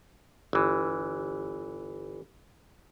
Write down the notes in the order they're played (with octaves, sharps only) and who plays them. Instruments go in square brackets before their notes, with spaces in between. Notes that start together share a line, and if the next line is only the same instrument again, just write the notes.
[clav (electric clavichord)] G1 E3